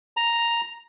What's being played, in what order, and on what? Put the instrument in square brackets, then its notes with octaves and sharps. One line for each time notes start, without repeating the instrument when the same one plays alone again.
[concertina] A#5